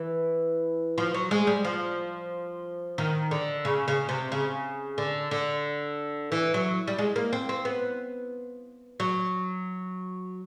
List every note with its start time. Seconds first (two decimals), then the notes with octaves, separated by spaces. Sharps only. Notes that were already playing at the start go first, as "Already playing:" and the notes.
Already playing: E3
0.98 F3
1.14 F#3
1.31 G#3
1.47 G3
1.65 F3
2.98 D#3
3.31 D3
3.65 C#3
3.88 C#3
4.09 C3
4.32 C#3
4.98 D3
5.31 D3
6.32 E3
6.54 F#3
6.87 G3
6.98 G#3
7.16 A#3
7.33 C4
7.49 C4
7.65 B3
9.00 F#3